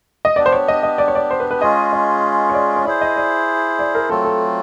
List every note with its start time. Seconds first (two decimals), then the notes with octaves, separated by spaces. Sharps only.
0.25 D#5
0.36 B3 D4 G4 D5
0.46 C5
0.52 C#5
0.68 D#5
0.83 D#5
0.98 D5
1.08 C#5
1.15 D5
1.31 C5
1.40 B4
1.51 B4
1.61 G#3 C#4 F4 G#4 D#5
1.93 D#5
2.49 C#5
2.54 D5
2.76 C#5
2.85 E4 G#4 C5 D5
3.01 D#5
3.16 D5
3.79 D5
3.95 A#4
4.09 F#3 A3 C4 F4 A4
4.25 A4